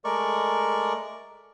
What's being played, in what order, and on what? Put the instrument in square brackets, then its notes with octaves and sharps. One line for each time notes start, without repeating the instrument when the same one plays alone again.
[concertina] G#3 A3 A#4 D5 C#6